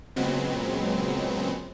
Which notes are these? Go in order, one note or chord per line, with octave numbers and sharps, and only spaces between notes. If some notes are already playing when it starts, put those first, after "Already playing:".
A#2 C#3 F#3 G#3 B3 C4